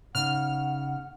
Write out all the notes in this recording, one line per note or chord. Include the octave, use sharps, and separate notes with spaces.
C#3 D#4 F#5 F6